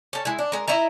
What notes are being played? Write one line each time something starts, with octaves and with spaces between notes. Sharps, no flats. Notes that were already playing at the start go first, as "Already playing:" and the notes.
C#4 A4
G#3 E4
D4
G#3 A#4
E4 D#5 E5 A#5